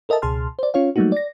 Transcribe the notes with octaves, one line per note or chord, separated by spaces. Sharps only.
A4 A#4 D#5 E5 A5
C#2 B2 G#4 A5 C6 F6
C5 D5
C#4 F4 C#5 F5
F#3 G3 A3 A#3 D#4 F#4
D5 A#6